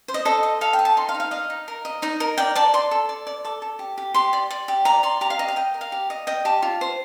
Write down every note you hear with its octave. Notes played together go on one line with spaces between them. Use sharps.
C5
D#5
A4 D#5
D#5
A4 F5
G5
D#5
A5
D#4 C6
F5
D#4
F5
D#5 F5
D#4
A#4
D#5
D#4 D#5
A#4
D5 G5
D5 A5
D5 C6
A4
D5
D5
A4 D6
A4
G4
G4
G4 C6
D5
D5
G4
D5 A#5
D5 C6
G4 A#5
F5
G4 D#5
F5
D#5 G5
A#4
F5
G4
D#5
D#5 G5
G4 A5
F4
C5